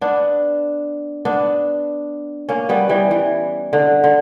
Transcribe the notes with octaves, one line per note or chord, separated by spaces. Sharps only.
B3 D4
B3 D4
A#3 C#4
G3 B3
E3 G3
E3
D3
D3